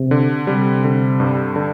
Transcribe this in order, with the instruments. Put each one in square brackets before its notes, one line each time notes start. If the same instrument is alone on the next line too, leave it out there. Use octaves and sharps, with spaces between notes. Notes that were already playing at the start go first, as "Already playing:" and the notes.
Already playing: [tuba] C3
[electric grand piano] D3
[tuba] C3 [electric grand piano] G3
[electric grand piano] D3
G2
D3